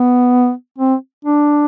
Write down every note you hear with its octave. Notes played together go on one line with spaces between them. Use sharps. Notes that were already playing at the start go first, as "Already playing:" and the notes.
Already playing: B3
C4
D4